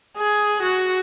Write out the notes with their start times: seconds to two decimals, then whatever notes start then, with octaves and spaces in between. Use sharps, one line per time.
0.18 G#4
0.62 F#4